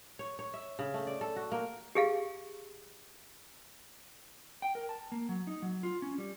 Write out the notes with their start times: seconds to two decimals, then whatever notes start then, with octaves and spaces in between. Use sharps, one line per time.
0.19 C#5
0.39 C#5
0.54 E5
0.79 C#3
0.94 A3
1.07 D5
1.21 A4
1.36 F#4
1.52 A#3
1.95 G4 G#4 F5
4.62 G5
4.75 A#4
4.89 A5
5.12 A#3
5.29 F#3
5.47 D#4
5.62 F#3
5.83 F4
6.02 C#4
6.18 G3